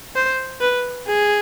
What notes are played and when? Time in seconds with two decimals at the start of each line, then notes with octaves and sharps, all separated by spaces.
0.16 C5
0.61 B4
1.07 G#4